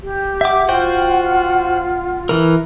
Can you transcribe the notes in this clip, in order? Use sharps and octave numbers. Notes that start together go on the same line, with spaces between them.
G4
E5 F#5 D6
F4 F#4 C5 G5
E3 A#4